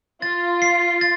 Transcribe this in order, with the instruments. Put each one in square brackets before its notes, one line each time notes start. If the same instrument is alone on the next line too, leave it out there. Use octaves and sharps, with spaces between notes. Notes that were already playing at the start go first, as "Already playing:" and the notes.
[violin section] F4 [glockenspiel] A6
[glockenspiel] C7
A6